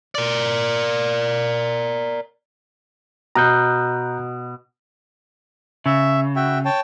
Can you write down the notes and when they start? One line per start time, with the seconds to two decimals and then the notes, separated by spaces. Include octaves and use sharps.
0.15 A#4 D5
3.35 B2 A#5 F#6 G6
5.86 C#3 E5
6.36 F#4 E5 G5
6.65 C#5 G5 A5